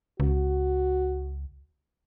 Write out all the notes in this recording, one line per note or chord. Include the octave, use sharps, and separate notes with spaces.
C#2 F#4